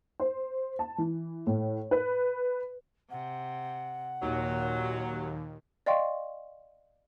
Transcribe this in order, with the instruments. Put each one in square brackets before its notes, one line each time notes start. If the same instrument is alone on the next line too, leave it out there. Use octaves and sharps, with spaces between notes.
[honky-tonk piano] C5
A5
E3
A2
B4
[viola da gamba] C3 [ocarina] F#5
[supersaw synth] D#2 [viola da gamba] A#2 [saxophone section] F#3
[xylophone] D5 D#5 F5 G5 C6 C#6